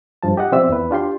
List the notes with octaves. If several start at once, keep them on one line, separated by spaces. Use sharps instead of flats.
G2 F3 A5
G4 D#5 F#5
B2 F3 C4 D5 E5 E6
E2 B4
D4 F4 G4 C6